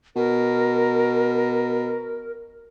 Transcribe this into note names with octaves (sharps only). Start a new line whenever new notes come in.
B2 A#4